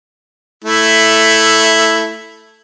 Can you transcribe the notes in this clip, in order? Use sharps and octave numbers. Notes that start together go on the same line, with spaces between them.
A3 E4